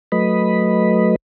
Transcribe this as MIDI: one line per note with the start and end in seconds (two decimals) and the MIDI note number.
0.12 1.16 54
0.12 1.16 57
0.12 1.16 71
0.12 1.16 75
0.12 1.16 83